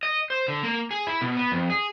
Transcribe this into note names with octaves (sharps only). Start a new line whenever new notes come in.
D#5
C5
D3
A#3
G#4
E4
B2
B3
F2
G#4